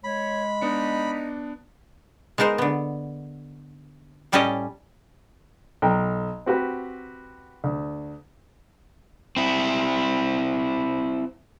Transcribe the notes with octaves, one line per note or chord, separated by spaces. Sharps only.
G#3 C#5 B5
B3 D4 D#4 C#7
G#3 B3 D#4 A#4 C5
D3 B3
A2 G3 C#4 G4 A4 D#5
B1 G5 A#5
C4 F#4 G4 B4
D2
C4 E4